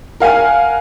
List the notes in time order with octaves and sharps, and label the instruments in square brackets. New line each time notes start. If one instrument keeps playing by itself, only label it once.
[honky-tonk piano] A#4 F5 F#5 G#5